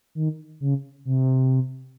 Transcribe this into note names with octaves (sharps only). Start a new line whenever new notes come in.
D#3
C#3
C3